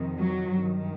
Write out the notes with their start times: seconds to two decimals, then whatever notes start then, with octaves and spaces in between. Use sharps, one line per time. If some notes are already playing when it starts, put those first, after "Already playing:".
Already playing: F2 C3 D#3
0.18 F#3
0.55 G2 D#3